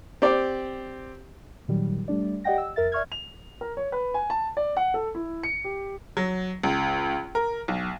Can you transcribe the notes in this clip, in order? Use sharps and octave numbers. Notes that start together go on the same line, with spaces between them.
C4 G4 D5
A#2 D#3 F#3 G3
G3 A3 D4 D5
G4 D5 D#5 F#5 G5 A#6
E6
F2 A#4 E5 A6
D5 E5 C#6 F6 G#6
F7
A#4
C#5
B4
G#5
A5
D5
F#5
A4
E4
C#7
G4
F#3
C#2
A#4
B1